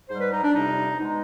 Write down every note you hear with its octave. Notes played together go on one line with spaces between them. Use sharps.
G#2 G3 C5
B4
D#4
D4
F2 C3 G3 D#4
B2 G#3 D#4